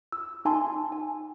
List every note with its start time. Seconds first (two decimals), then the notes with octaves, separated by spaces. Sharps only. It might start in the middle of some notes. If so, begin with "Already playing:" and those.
0.12 E6
0.45 D#4 G#5 A5 C6
0.92 G#5